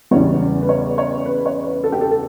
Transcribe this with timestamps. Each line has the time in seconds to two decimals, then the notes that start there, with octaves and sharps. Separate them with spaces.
0.11 E2 C#3 E3 G3 C#5
0.62 B4
0.69 C#5
0.98 C#5
1.26 B4
1.46 C#5
1.63 B4
1.84 A4
1.92 G4
2.01 A4
2.11 A4